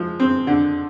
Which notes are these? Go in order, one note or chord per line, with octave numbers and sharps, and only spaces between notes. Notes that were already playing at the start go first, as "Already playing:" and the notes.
Already playing: F3 G#3
C4
D3